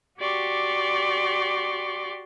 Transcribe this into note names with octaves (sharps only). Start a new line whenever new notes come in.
F#4 G4 D5 C6 C#6